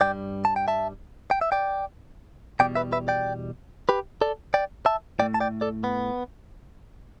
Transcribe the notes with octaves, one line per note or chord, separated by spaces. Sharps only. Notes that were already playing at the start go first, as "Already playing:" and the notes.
G2 G3 D5 G5
A5
G5
E5 A5
G5
E5
D5 G5
E2 B2 G3 D5 G5
B4 E5
B4 E5
D5 G5
G4 B4
A4 D5
D5 G5
E5 A5
A2 A3 D5 G5
A5
D5 G5
A4 D5
B3